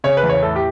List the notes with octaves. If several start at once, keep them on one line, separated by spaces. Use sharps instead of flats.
C#3 C#5
B4
E2
C#5
A2 A4
G4